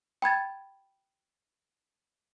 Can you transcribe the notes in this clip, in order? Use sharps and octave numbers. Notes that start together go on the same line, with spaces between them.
G5 B5 G#6 A6